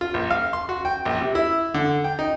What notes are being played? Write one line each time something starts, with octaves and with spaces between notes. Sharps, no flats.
F4
A#1
F5
C6
F#4
G5
A#1
C3
E4
D3
G5
D#4